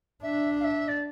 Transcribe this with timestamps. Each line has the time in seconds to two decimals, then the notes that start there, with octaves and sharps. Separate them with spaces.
0.23 D4 E5
0.60 F5
0.64 E5
0.88 D5